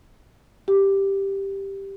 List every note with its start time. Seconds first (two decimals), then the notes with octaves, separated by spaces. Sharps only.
0.68 G4